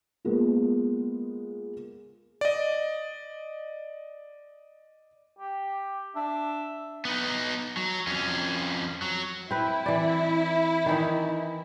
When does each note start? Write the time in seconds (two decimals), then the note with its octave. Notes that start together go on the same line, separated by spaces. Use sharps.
0.25 G#3 A#3 B3 F4
2.41 D5 D#5
5.39 G4
6.16 D4 E5
7.05 B3 D#4
7.77 F#3
8.07 F2 C#4
9.02 F#3
9.51 C4 E4 B4
9.86 E3 D5
10.86 D#3 E3 D#4